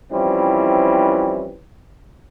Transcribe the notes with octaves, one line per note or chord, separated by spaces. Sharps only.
E3 F3 G3 C4 C#4 E4